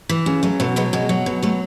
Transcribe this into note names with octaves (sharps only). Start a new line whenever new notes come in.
E3
C#3
F#3 A3
B2 A3
F#3 G#3 B3
B2 G#3
F#3
B2
F#3 A3